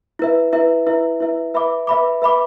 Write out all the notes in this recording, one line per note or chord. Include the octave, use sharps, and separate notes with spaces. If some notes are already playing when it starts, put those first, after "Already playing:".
E4 B4 E5
E4 B4 E5
E4 B4 E5
E4 B4 E5
B4 E5 B5 D6
B4 E5 B5 D6
B4 E5 B5 D6